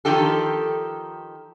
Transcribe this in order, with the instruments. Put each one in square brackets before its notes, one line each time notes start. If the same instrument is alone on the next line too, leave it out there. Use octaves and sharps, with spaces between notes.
[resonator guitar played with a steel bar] D#3 F3 D#4 G4 A4